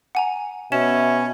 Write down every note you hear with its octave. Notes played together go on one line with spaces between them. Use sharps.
F#5 G#5 A#5
B2 C#4 E5 E7